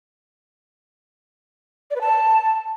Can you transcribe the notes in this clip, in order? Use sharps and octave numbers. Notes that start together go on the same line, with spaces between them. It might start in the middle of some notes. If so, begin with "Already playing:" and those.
D5
B4
A5